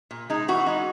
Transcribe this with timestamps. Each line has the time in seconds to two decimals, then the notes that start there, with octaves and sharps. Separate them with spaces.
0.11 A#2
0.30 G#3 D#4
0.48 E3 F#4
0.66 G#3 D#4